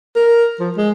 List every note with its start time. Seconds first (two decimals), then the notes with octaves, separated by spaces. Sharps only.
0.16 A#4
0.60 F3
0.77 G#3